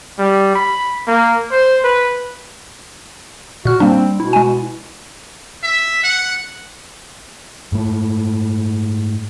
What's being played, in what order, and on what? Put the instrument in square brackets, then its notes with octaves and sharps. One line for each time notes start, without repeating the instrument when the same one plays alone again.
[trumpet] G3
B5
A#3
C5
B4
[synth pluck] A#2 F6 [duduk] F#4
[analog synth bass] G3 [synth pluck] A#3 D4 [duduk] C4
[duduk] B2 [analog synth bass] E4
[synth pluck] G#3 G#5
[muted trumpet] E5
F#5
[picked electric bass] G#2 A3